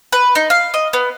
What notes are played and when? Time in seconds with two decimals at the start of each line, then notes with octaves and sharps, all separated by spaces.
0.12 B4
0.35 D#4
0.50 F5
0.74 D#5
0.93 B3